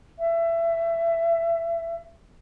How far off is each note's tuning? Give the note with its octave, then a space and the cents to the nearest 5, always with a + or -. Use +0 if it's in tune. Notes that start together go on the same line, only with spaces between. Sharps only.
E5 +25